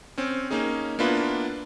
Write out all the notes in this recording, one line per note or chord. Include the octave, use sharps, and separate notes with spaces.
C4 C#4
A#3 C#4 D#4 G#4
A#3 B3 D4 E4 F4 B4